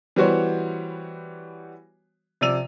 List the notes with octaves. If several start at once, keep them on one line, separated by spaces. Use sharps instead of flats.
E3 G3 B3 F#4 C5 C#5
C3 F3 D5 E6 D#7 F7